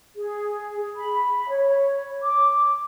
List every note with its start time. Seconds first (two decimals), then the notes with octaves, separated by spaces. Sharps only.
0.15 G#4
0.96 B5
1.50 C#5
2.22 D6